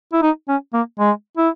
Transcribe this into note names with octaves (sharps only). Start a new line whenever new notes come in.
E4
D#4
C#4
A#3
G#3
E4